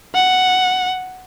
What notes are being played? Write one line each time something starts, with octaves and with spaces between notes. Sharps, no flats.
F#5